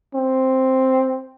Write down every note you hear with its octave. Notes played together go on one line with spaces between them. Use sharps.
C4